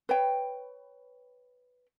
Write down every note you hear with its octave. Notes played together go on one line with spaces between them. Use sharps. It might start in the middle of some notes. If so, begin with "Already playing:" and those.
B4 C#5 G5